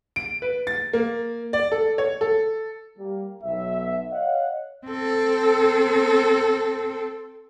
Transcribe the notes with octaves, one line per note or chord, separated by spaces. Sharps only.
D7
B4
A6
A#3
D5
A4
C#5
A4
G3 A#3
B1 E5
C#5 D#5 F5 F#5
C4 A4